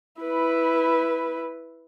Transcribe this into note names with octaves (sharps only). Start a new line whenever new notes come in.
E4 B4